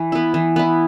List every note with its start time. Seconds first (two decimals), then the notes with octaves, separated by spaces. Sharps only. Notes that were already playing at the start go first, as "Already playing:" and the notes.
Already playing: E3
0.12 B3 E4
0.34 E3
0.56 B3 E4